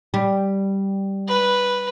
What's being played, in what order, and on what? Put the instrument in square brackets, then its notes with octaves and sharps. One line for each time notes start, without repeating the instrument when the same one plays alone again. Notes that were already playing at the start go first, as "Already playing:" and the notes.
[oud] G3
[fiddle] B4